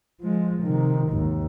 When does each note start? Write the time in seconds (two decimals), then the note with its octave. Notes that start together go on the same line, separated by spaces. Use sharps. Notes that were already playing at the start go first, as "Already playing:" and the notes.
0.21 F3 G#3
0.63 C3 D#3
1.09 G#1 D#2